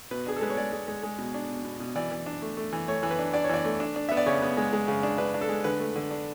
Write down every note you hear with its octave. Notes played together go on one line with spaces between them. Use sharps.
B2 B4
D4 G#4
A4
G#3 B4
C#5
G#3 D5
G#3
G#3
G#3
B2
D4
B2
B2
B2
E3 D5
E3
D4
A3
A3
E3
A3 C#5
E3
B4
D4
D4 D5
C#5
E3 D5
A3
D4
D4
B3 E5
D5
C#3 C#5
B3
G#3
G#3
C#3
D4
D4 B4
D4
A4
G#3
D3 B4
A3
D3
D4